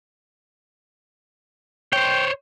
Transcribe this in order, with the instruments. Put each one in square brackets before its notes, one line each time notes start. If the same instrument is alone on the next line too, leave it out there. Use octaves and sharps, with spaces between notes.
[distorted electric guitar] C5 C#5 [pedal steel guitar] G5